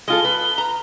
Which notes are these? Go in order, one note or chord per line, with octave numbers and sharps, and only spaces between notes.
G#3 F4 A4 G7
B4
A#5